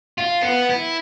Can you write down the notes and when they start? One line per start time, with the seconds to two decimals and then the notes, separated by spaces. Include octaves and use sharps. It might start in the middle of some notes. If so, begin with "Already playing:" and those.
0.18 F4
0.42 B3
0.69 E4